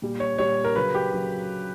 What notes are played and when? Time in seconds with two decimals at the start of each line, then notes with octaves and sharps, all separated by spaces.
0.02 A#2 G3
0.20 C#5
0.38 A#2 G3 C#5
0.65 A#4
0.76 C#3 F#3 B4
0.95 G4
1.13 C#3 F#3